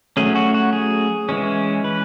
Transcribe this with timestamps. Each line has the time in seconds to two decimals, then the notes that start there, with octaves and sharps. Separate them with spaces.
0.17 F#3 A3 C#4 G#4
0.35 F#4
0.54 F#4
0.73 G#4
1.29 E3 G#3 C#4
1.84 B4